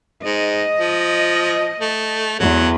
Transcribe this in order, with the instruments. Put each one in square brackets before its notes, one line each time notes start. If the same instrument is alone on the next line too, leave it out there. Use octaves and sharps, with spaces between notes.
[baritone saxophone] G#2 [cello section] D#5
[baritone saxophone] F3
A3
[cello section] E2 [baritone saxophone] F#3